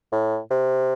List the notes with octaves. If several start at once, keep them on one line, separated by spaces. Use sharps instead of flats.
A2
C3